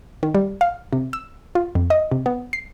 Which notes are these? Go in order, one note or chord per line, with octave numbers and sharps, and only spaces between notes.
D#3
G3
F5
C3
E6
F4
F2
D#5
C3
B3
C7